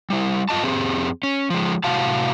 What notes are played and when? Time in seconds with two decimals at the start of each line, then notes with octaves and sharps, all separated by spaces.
0.10 G3 E4
0.49 G2 F4 D#5 A5
0.63 F2 C4 G4 G#4
1.23 C#4
1.50 F3 G#3
1.84 A2 C3 F#4 F5 A5